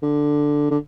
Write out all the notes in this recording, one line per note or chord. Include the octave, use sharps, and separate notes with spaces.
D3
D3